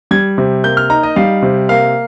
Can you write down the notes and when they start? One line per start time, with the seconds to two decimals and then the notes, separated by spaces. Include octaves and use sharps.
0.11 G3 G#6
0.38 C3
0.64 A#3 G6
0.77 F6
0.90 D#4 A#5
1.03 D#5
1.16 G3 F5
1.42 C3
1.69 A#3 F5